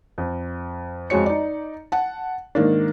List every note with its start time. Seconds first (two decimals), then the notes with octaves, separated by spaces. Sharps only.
0.18 F2
1.10 F2 G#3 F#4 C#5 C#7
1.26 D#4 D5
1.92 F#5 A5
2.55 G#2 D#3 A#3 D4